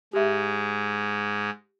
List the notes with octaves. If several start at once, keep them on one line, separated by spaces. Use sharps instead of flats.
G#2 G#3 G4 E5